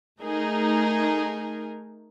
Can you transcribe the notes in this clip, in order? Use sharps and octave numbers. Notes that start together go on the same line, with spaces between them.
A3 D#4 G#4 A#4